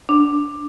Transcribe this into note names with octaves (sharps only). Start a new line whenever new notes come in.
D4